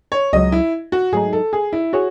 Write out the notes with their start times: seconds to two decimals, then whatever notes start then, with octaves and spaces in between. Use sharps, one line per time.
0.12 C#5
0.33 C#2 C#3 F#3 D#5
0.52 E4
0.92 F#4
1.12 G#2 F#3 A3 D#4 G#4
1.33 A4
1.53 G#4
1.73 E4
1.93 F#4 G#4 C#5